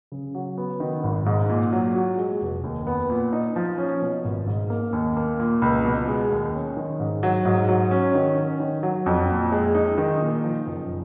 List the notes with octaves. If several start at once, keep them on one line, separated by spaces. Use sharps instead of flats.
C#3
F#3
B3
D#3
G#1
G#2
A#2
F#3
F#4
G#3
F1
D#2
B3
A#2
D#4
F3
C#4
B2
G#1
G#2
A#3
D#2
A#3
A#2
C#2
B2
G#3
D#2
C#4
D#3
G#2
F#3
G#2
F#3
C#4
D#3
C#4
D#3
F#3
F2
A#2
G#3
D#4
D#3
A#2
F3
F#1